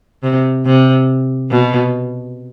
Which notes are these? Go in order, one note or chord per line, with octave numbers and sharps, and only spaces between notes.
C3
C3
B2